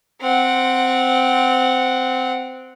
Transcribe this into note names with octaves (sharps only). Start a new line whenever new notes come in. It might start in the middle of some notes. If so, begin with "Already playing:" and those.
C4 F#5